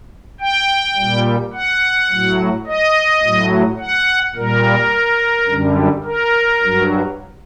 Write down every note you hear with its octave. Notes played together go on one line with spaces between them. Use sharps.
G5
A#2 G3
F#5
A2 F#3
D#5
A2 F#3
F#5
A#2 G3 A#4
F#2 D3 G3
A#4
G2 F#3